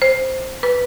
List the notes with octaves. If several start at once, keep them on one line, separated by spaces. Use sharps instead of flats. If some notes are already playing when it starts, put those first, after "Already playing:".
C5
B4